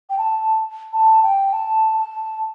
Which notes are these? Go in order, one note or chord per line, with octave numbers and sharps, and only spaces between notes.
G5
A5
A5
G5
A5
A5